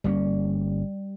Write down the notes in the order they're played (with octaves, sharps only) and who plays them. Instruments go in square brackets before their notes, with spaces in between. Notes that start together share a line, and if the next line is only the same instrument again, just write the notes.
[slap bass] G1 A#3 C#4 [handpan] G3